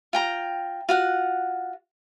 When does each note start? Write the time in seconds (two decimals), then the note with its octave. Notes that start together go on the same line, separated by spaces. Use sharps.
0.13 F4 G5 A#5
0.89 F4 F#4 F#5